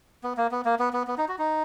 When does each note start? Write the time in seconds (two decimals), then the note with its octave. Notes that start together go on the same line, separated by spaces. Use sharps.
0.24 B3
0.37 A#3
0.51 B3
0.65 A#3
0.79 B3
0.93 B3
1.07 B3
1.18 D#4
1.28 F#4
1.39 D#4